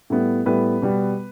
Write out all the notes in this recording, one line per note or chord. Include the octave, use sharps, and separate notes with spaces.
A2 G3 B3
A2 G3 B3 B4
B2 G3 B3